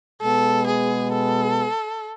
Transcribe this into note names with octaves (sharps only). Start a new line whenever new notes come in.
B2 G#3 B3 A4
G#4
A4